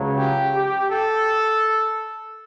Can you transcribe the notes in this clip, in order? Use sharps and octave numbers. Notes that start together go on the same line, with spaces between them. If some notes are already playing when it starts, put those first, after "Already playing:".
Already playing: C#2 C#3 F#3
G4
G4
A4